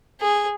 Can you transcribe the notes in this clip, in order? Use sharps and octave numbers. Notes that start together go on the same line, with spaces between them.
G#4